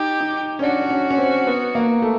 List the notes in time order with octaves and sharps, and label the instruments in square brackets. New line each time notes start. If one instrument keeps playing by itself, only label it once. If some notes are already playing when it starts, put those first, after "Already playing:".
Already playing: [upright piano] D#4 [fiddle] G4
[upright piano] D#4
C#4
[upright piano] D4 [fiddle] F#4
[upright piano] C#4
C#4
C4
B3
A#3
A3